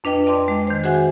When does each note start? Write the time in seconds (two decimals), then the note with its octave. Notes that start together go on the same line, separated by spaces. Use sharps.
0.04 F2 D4 B4 D#5 G5
0.26 D5 D#5 A5 C6 D6
0.48 G#3
0.67 D#3 C5
0.84 F#4 G#4 C5 E5 F#5 G#5